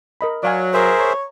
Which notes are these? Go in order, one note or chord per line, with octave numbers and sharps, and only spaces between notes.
A#4 D#5 B5
F#3 D5 F5 G#5
G#4 A#4 C5 E5
C#5 A#5